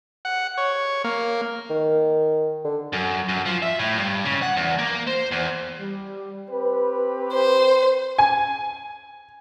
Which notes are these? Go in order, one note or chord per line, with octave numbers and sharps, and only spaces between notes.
F#5
C#5
A#3
D#3
D3
F#2
F#2
F3
E5
A2
G2
C#3
F#5
E2
A#3
C5
E2
G3
C4 G4 B4
C5
G#5